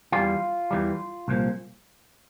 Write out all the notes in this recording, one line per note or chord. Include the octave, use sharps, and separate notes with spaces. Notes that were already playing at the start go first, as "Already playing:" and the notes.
E2 E3 G3 F4
E2 E3 G3
C2 A#2 F3